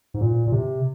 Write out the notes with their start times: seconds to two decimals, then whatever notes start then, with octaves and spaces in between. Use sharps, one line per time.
0.14 G#2
0.21 A#2
0.47 A#2
0.52 C3